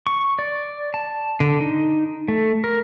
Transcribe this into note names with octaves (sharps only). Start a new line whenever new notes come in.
C#6
D5
A5
D3
D#4
A3
A#4